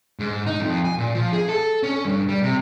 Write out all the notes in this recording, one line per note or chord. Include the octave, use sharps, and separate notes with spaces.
G#2
D#4
F2
G#5
A#2
F3
G#4
A4
C#4
G2
G3
C3